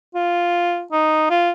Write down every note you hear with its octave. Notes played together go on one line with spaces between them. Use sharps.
F4
D#4
F4